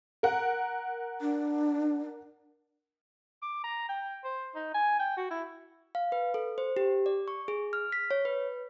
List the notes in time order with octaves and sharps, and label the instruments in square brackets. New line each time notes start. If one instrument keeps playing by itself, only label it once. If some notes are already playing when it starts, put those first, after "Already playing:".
[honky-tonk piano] A#4 F#5
[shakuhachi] D4
[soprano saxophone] D6
A#5
G5
C5
D#4
G#5
G5
F#4
E4
[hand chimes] F5
B4
A4
C5
G4
D5
C#6
G#4
F6
B6
C#5
B4